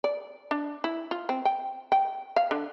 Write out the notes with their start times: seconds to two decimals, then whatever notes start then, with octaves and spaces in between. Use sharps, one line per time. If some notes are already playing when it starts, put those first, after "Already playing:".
0.04 D5
0.51 D4
0.84 E4
1.11 F4
1.29 C4
1.45 G5
1.92 G5
2.36 F5
2.51 D3